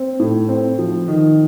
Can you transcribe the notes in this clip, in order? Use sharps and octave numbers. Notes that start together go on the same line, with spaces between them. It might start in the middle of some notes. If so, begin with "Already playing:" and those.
Already playing: C4
A2
C4
F3
D#3